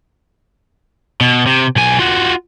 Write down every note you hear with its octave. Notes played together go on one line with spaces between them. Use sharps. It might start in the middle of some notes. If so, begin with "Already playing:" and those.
B2
C3
B1 G#5
F4 F#4